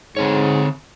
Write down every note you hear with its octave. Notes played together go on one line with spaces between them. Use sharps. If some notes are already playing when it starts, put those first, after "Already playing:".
G#2 D3 C4 C#5